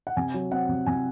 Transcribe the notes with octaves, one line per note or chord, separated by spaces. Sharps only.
F#5
C3 G#5
F#3
C4 F#5
C3
C3 G#5